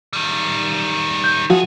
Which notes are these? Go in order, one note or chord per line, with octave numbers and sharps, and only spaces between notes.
D#3 G3
G6
F3 A3 F4 F#4 G#4